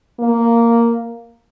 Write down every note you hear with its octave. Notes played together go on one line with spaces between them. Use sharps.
A#3